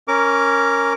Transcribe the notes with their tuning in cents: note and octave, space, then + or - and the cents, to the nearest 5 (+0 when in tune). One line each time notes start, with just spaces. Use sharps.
C#4 +0 A#4 +0 D6 -25